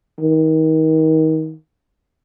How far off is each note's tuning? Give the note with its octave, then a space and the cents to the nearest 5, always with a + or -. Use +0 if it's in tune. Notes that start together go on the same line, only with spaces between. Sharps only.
D#3 +30